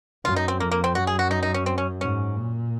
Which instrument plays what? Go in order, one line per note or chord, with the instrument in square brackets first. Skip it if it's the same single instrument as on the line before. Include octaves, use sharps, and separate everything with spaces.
[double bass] F#2 [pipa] F4
[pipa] D#4
C4
[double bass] F2 [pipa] A#3
[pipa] A#3
C4
[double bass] F#2 [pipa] F#4
[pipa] G#4
F#4
D#4
D#4
C#4
C4
C#4
[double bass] G#2 [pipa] C#4
[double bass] A#2